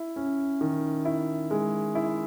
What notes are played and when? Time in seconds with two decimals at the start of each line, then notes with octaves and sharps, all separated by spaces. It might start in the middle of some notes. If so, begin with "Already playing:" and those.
Already playing: E4
0.16 C#4
0.61 D#3
1.05 E4
1.51 G#3
1.95 E4